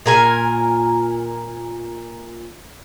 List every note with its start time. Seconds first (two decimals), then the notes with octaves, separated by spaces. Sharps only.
0.06 A#2 A#4 G#5